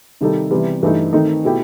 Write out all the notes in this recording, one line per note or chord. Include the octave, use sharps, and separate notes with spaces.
C3 D#3 G3 D#4 A4
C3 E3 G3 B3
G2 E3 A3 D#4
D#3 A3 C4 D#4
B2 A3 E4 G4